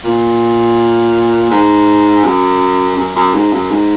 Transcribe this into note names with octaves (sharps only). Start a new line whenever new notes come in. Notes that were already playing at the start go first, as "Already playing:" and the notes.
A#2
G#2
F#2
F#2
F#2
G#2
F#2
G#2